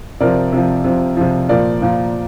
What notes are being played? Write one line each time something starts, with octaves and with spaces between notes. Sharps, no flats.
C3 F3 A#4 D5
C3 F3
C3 F3
C3 F3
A#2 F3 A#4 D5
A#2 F3